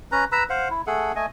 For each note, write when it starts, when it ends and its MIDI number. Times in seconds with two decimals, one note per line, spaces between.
0.12 0.25 61
0.12 0.25 71
0.12 0.25 82
0.32 0.44 71
0.32 0.44 82
0.32 0.44 83
0.32 0.44 88
0.50 0.68 72
0.50 0.68 77
0.50 0.68 78
0.70 0.82 64
0.87 1.12 57
0.87 1.12 68
0.87 1.12 69
0.87 1.12 78
1.15 1.26 57
1.15 1.26 75
1.15 1.26 80